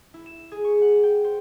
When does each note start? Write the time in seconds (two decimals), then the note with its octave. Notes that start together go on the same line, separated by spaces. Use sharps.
0.14 E4
0.26 E7
0.51 G#4
0.64 C#6
0.82 F#5
1.03 G5
1.24 C5